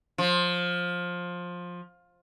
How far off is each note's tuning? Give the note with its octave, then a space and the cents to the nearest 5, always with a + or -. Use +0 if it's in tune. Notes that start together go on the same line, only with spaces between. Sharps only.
F3 +15